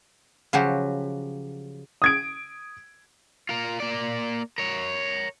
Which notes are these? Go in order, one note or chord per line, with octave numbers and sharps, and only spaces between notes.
C#3 F3 F#3 F#4 G4
D#6 G#6 D7
F4 A#4
A#3 D5
A#4 C#5